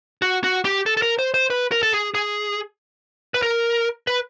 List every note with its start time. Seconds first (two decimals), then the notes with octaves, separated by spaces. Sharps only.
0.22 F#4
0.44 F#4
0.65 G4
0.86 A4
0.97 A4
1.02 A#4
1.19 C5
1.34 C5
1.50 B4
1.72 A#4
1.83 A4
1.93 G#4
2.15 G#4
3.34 B4
3.42 A#4
4.07 B4